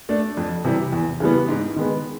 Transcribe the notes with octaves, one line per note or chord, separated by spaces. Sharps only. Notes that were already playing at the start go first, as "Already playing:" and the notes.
A3 D4
F2
C3 E3 G3
E2
C#3 E3 G3 B3
G#2
D#3 G#3 B3